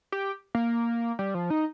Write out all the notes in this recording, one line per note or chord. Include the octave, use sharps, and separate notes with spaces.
G4
A#3
G3
F3
D#4